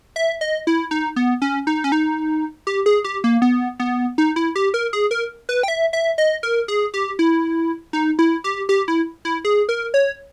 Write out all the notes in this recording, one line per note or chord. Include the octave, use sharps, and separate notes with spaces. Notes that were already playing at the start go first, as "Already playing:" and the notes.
E5
D#5
E4
D#4
B3
C#4
D#4
C#4
D#4
G4
G#4
G4
A#3
B3
B3
D#4
E4
G4
A#4
G#4
A#4
B4
G5
E5
E5
D#5
A#4
G#4
G4
E4
D#4
E4
G4
G4
E4
E4
G#4
A#4
C#5